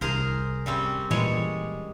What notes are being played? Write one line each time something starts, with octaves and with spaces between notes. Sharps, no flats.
C2 G#4 A#4 C5
G3 C4 C#4
A#2 E3 G3 G#3 C#5